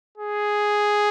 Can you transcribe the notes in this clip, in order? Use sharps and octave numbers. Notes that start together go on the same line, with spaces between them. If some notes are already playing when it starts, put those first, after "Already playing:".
G#4